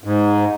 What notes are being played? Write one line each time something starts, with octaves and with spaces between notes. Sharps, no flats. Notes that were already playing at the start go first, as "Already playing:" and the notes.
G#2